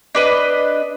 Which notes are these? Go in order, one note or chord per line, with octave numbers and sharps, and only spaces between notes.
D4 B4 D#5